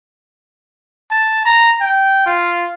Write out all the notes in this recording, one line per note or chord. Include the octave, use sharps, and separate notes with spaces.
A5
A#5
G5
F4